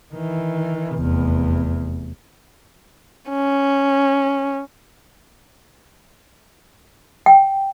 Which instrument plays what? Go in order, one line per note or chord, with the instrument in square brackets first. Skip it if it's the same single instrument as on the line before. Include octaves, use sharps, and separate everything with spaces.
[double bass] D#3 E3
F1 E2
[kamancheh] C#4
[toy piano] G5